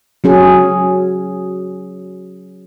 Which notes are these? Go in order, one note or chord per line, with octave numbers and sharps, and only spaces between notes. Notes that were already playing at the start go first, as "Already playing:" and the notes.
F#3 C#4 G#4